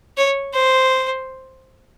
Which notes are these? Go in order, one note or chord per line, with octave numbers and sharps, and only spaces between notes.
C#5
C5